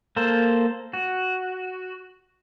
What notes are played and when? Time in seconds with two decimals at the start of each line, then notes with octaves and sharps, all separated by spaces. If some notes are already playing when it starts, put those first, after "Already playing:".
0.16 A#3 A4 C5
0.93 F#4